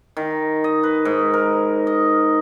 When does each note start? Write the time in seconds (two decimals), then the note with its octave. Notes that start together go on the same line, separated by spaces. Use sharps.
0.17 D#3
0.64 D#5
0.83 B4
1.05 G#2
1.34 A#4
1.87 D#5